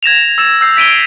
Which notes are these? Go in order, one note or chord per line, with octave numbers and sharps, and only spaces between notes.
G#6 A#6 E7 F7
E6 A6 E7
E6 G6 C7
B6 D7 D#7 G7